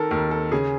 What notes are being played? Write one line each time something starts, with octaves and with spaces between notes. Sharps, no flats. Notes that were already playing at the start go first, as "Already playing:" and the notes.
Already playing: D#3 A4 A#4
D#2 A#4
A4
C#3 G#4